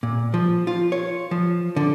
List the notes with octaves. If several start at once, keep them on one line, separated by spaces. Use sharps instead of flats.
A#2
F3
F4
C#5
F3
D3